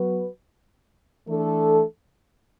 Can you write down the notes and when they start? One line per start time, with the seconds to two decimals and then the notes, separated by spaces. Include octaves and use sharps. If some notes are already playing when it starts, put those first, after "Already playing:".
Already playing: F#3 B3 F#4 B4
1.28 E3 A3 D4 A4